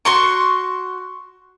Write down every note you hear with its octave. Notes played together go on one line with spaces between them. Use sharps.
F#4 C6 C#6